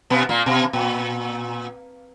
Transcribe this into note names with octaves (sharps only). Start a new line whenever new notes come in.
B2 B3
A#2 A#3
B2
A#2